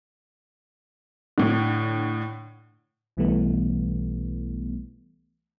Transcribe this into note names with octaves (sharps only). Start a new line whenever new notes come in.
A2 D3
B1 B2 E3 G3 A3 B3